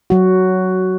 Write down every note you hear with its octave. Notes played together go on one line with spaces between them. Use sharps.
F#3 F#4